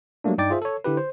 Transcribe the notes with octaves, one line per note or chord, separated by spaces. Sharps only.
F#3 G3 A3 A#3 D4
G2 D#4 D5 G5 D6 A6
F4 G#4 C5 E5
A4 C#5
D3 E4 G4 B4
C5